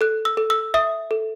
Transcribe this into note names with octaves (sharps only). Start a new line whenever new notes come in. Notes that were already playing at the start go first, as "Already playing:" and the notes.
A4 F#6
E6
A4
E6
E5 D#6
A4